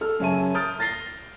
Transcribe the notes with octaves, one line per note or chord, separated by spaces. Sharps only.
A4 F6
F#2 C#3 C#5 E5 A5 D#7
D#6 F6 G6 A6 D7
F6 A6 A#6 C7 G7